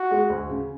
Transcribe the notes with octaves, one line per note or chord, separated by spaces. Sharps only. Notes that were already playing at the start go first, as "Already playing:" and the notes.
Already playing: F#4
G#3
D2
C#3